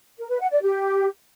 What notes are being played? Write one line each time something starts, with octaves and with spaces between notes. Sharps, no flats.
A#4
B4
F#5
D5
G4